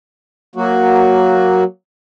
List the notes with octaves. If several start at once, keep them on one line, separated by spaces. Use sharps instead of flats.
F#3 A#3 F#4